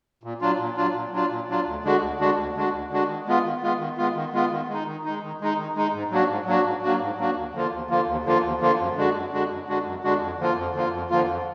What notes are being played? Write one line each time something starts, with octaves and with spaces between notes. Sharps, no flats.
A#2
F#3 D4 F4
A#2
F#3 D4 F4
A#2
F#3 D4 F4
A#2
F#3 D4 F4
D2
D3 G#3 D4 F#4
D2
D3 G#3 D4 F#4
D2
D3 G#3 D4 F#4
D2
D3 G#3 D4 F#4
D#3
G#3 B3 F4
D#3
G#3 B3 F4
D#3
G#3 B3 F4
D#3
G#3 B3 F4
D#3
G#3 D#4
D#3
G#3 D#4
D#3
G#3 D#4
D#3
G#3 D#4
G#2
F#3 A#3 D4 F#4
G#2
F#3 A#3 D4 F#4
G#2
F#3 A#3 D4 F#4
G#2
F#3 A#3 D4 F#4
D#2
D3 F3 A#3 F4
D#2
D3 F3 A#3 F4
D#2
D3 F3 A#3 F4
D#2
D3 F3 A#3 F4
F#2
D3 G#3 D4 F#4
F#2
D3 G#3 D4 F#4
F#2
D3 G#3 D4 F#4
F#2
D3 G#3 D4 F#4
F2
D3 F3 A#3 F4
F2
D3 F3 A#3 F4
F2
D3 F3 A#3 F4
F2